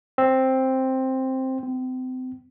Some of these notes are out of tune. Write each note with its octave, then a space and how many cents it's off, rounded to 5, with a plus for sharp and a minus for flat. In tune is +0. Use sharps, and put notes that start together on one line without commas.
C4 +5
C4 -35